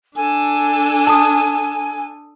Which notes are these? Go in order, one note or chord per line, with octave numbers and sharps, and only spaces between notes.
D4 A4 G#5
A5 D#6